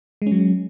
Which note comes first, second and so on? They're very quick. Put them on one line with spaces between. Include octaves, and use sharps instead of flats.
G#3 C#4 F#3